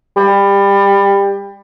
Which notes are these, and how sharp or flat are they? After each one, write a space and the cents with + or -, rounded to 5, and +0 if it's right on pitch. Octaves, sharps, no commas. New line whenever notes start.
G3 +25